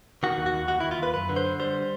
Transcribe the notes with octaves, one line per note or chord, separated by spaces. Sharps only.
D#3 F#4
D#2
F#4
D#2
D#2 F#4
E4
D#2
F4
D#2 B4
F#2 B4
D3
C5
D3
G3 C5